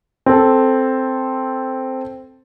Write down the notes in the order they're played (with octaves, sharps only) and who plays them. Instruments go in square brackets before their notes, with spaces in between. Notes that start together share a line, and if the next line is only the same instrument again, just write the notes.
[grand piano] C4 A4